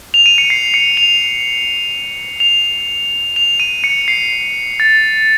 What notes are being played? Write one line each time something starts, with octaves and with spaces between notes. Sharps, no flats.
F7
D#7
C#7
C7
C#7
F7
F7
F7
D#7
C#7
C7
A6